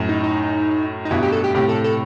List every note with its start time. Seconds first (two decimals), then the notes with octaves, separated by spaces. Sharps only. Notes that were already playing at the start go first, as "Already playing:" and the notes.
Already playing: F#2 A2
0.09 D#4
0.23 D#4
1.05 D#4
1.11 G2 B2 E4
1.23 G4
1.32 A4
1.44 G4
1.54 A2 C3 G4
1.69 A4
1.84 A4